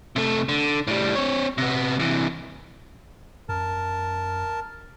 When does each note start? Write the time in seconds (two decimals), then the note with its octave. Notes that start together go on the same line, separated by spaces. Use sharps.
0.16 C3 A3
0.49 D3
0.87 A2 G3
1.15 C4 C#5
1.58 C3 B3
1.99 C3 E3
3.49 F#2 A#4 A5